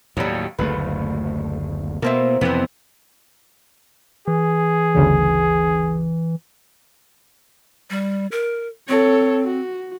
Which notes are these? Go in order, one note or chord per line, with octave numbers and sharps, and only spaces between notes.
D#2 A2 F#3 G3
F#1 D2 A3 B4
B2 A#3 C4 E4
F2 C3 E3 B3 C4
E3 G#4
G1 D2 C#3
G3
A#4
C4 A4 C#5
F#4